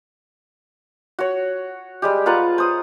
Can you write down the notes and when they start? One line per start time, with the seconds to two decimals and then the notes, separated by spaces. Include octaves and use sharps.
1.19 F#4 C#5
2.02 G3 G#3 G4
2.26 F4 B4 F#5 A#5
2.58 C5 D#6